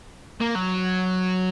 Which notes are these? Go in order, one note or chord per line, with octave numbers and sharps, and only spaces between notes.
A#3
F#3